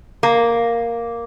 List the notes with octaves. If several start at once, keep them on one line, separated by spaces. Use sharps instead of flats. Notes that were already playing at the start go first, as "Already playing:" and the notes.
A#3